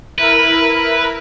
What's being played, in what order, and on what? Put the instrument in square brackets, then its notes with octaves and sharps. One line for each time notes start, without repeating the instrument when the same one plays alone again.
[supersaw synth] E4 A#4 B5 [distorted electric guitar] B4